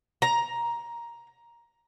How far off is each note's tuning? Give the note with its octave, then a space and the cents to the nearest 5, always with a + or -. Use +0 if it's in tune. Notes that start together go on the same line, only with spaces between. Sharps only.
A#5 +10